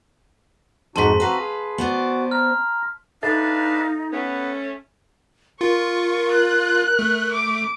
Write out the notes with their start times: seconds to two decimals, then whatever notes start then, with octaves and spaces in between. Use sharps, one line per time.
0.96 F2 G#2 D#4 F#4 A5 C6 B6
1.20 C4 F#4 B4 F5 A#5
1.39 G#4
1.78 B3 F#4 C5 D5
2.31 A#5 F6
3.23 D4 D#4 A4 B4 E5 F5 A5 A6
4.12 A3 B3 C#4 B4
5.61 F4 A#4 C#6
6.32 F#6
6.99 A3
7.32 D6